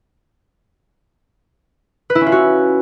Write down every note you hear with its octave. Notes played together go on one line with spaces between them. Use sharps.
B4
E4
C#4
F4
F#4